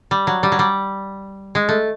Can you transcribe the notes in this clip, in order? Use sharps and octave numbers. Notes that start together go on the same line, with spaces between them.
G3
F#3
G3
F#3
G3
G#3
A3